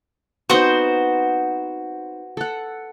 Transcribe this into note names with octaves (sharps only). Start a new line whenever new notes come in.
B3 C4 D#4 F#4 C5
A4 F#5